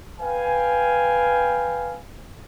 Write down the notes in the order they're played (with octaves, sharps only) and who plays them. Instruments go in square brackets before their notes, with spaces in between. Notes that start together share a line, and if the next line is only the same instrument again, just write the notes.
[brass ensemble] B4 F5 G5 G#5